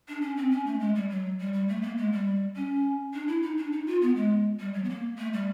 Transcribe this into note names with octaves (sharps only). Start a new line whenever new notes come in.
D4
C#4
C4
C#4
A3
G#3
G3
F#3
G3
G3
A3
A#3
G#3
G3
C#4
D4
E4
D#4
D4
D#4
F4
B3
G#3
G3
F#3
B3
A#3
A3
G3